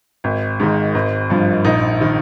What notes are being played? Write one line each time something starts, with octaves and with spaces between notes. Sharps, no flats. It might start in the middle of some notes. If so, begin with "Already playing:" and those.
G#1
G#2 D#3
G#1
G2 F3
A#1 D#4
D#3